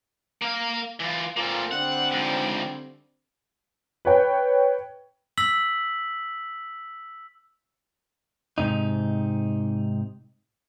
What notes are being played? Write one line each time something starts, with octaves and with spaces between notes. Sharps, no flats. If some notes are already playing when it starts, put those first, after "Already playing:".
A#3 F5
E3 F4
A#2 A#3 C4 F4 A4
D3 G3 C4 F#5
G#2 F3
B4 C#5 G5
E6 B6 F#7
G#2 C3 D#4